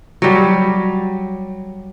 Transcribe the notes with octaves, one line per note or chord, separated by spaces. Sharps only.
F#3 G3